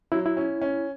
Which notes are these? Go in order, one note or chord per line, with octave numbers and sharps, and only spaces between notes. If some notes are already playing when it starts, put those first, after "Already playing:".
F#3 E4
E4
C#4
C#4